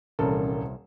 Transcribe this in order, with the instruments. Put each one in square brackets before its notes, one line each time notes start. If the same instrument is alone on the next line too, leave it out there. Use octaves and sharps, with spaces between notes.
[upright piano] D#1 A4 [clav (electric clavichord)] C2 [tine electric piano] E3 C#4 A#4